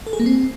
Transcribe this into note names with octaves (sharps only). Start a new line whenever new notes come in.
A4
G#4
A#3
C4